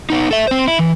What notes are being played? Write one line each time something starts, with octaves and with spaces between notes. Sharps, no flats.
B3 D#4
A4 E5
C4 C5
E4
E3